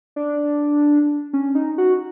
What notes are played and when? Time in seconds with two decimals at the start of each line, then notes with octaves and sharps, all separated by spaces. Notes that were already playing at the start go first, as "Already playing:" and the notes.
0.16 D4
1.33 C#4
1.55 D#4
1.78 F#4